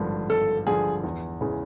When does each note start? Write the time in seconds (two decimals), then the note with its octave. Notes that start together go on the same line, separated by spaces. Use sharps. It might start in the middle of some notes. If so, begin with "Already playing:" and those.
Already playing: G#1 G2 D3 F3
0.29 G#1 A4
0.67 G2 D3 F3 G#4
1.04 E2
1.41 C#3 E3 G#3